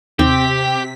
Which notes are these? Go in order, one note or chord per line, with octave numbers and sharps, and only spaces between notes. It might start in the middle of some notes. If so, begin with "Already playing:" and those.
D#2 C3 C4 G4 B6